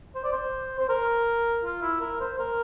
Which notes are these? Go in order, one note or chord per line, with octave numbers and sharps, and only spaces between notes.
C5
D5
C5
C5
A#4
F4
E4
A#4
C5
A#4